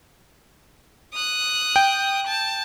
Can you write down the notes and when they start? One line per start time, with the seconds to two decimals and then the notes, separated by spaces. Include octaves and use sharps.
1.14 D#6 F#6
1.76 G5
2.27 A5